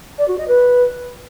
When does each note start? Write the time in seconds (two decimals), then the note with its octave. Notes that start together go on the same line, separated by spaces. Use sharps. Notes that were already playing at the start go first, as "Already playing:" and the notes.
0.17 D5
0.27 F#4
0.37 D#5
0.47 B4